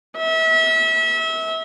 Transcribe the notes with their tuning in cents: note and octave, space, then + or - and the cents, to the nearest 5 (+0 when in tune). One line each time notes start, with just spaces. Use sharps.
E5 -30